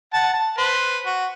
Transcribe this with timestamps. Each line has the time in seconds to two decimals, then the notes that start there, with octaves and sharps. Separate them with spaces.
0.13 F#5 A5
0.34 A5
0.58 B4 C5
1.06 F#4